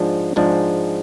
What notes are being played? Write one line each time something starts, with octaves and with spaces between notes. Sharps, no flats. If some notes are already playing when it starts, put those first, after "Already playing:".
Already playing: G#2 F3 G#3 D4
G#2 F3 G#3 D4